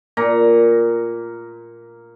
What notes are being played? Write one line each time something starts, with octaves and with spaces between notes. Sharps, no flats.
A#2 A#5